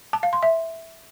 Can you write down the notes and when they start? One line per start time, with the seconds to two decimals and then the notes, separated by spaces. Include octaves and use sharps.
0.13 A5
0.23 F5
0.33 C6
0.43 E5